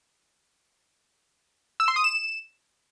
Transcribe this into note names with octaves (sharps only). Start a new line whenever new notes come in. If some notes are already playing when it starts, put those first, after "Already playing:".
E6
C6
D#6
E7